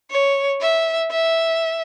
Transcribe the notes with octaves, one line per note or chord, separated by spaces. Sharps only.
C#5
E5
E5